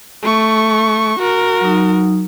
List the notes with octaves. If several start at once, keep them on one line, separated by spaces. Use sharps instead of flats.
A3 C#6
F#4 A#4
F#3 D#4